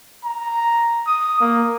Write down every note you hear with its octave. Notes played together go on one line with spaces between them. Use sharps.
A#5
D#6
A#3